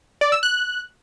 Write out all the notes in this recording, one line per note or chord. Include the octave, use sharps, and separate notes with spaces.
D5
E6
F#6